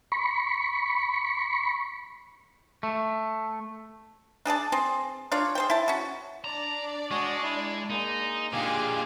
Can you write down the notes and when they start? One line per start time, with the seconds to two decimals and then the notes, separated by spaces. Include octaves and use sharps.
0.12 B5 C#6
2.83 A3
4.45 D4 G#4 D5 A5
4.72 C4 G#4 C5
5.32 D4 F4 C#5 D5
5.55 G#4 C5 G5
5.70 E4 A5
5.88 C#4 F#4
6.44 D4 D5 A#5
7.11 G#3 F#4 G#4 C#5 C#6
7.43 E4
7.90 G#3 A#3 D#4
8.53 A#2 D3 D#4 G4 G#4 F5 G#5